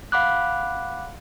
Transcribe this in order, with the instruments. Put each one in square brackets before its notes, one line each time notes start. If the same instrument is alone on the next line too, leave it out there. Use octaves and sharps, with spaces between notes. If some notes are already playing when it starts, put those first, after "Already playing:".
[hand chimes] F5 F#5 B5 D6 F#6